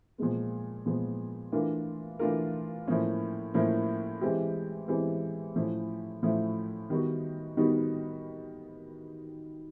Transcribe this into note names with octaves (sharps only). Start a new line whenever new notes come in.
A#2 F3 G#3 B3
A#2 F3 G#3 B3
E3 A3 D4 F4 A#4
E3 A3 D4 F4 A#4
A2 F3 A#3 C#4 E4
A2 F3 A#3 C#4 E4
E3 G#3 C4 E4 G4
E3 G#3 C4 E4 G4
A2 F3 A3 C#4 E4
A2 F3 A3 C#4 E4
D#3 G3 B3 D#4 F#4
D#3 G3 B3 D#4 F#4